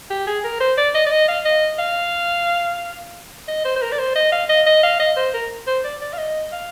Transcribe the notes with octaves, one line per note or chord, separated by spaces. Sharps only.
G4
G#4
A#4
C5
D5
D#5
D5
D#5
F5
D#5
F5
D#5
C5
C5
A#4
D5
C5
D#5
F5
D#5
D#5
F5
D#5
C5
A#4
C5
D5
D5
F5
D#5
F5